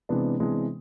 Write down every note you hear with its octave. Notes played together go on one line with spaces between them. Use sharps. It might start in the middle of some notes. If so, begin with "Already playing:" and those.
C3 E3 G#3 B3 D4
C3 E3 G#3 B3 D4